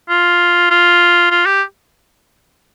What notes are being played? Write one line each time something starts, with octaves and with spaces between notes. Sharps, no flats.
F4
F4
F4
G4